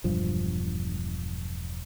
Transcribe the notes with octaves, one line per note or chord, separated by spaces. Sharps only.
E1 G2 F3